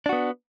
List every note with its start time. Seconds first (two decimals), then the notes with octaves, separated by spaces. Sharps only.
0.06 D4
0.09 F#4
0.13 B3